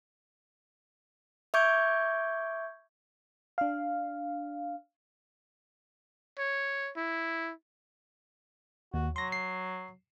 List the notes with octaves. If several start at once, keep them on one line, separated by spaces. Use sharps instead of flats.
E5 C#6 D6 G6 G#6 D7
D4 F5
C#5
E4
D#2 F#4
F#3 C6 A#6
C7